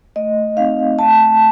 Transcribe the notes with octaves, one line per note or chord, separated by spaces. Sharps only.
A3 D#5
C4 D#4 F5
A3 A5